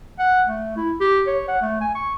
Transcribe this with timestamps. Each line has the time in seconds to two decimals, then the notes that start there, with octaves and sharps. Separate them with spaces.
0.19 F#5
0.47 A3
0.77 E4
1.01 G4
1.27 C#5
1.48 F#5
1.62 A3
1.81 G#5
1.95 C#6